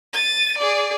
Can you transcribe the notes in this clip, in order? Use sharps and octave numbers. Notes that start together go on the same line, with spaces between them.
A6 D#7
G#4 D5